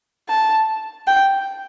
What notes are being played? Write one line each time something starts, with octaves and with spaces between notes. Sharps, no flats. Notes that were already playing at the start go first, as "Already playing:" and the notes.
A5
G5